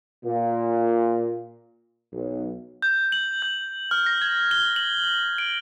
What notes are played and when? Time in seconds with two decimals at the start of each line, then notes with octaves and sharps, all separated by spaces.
0.25 A#2
2.13 B1
2.82 G6
3.12 F#7
3.42 G6
3.91 F6
4.06 A#6
4.22 G#6
4.51 G7
4.76 F#7
5.38 D7